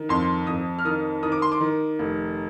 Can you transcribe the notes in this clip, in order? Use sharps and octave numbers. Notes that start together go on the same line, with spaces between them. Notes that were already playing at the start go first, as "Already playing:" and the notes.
Already playing: D#3
F2 C6
F2 D#6
F6
D#3 D#6
D#3 D#6
D6
C6
D6
D#3
F1